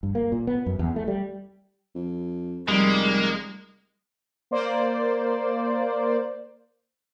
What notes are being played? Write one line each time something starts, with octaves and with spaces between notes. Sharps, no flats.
G2
A#3
A#2
B3
F#2
E2
A3
G3
F2
F1 G3 G#3 A#3
A#3 C5 D5